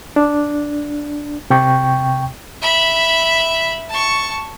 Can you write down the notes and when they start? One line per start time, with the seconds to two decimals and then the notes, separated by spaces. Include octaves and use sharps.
0.16 D4
1.50 C3 G5 C#6
2.62 E5 B5
3.89 A5 C#6